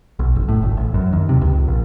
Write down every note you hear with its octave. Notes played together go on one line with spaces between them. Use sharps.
B1
F#1
A2
G#1
A1
F#2
D#2
C3
C#2
A#1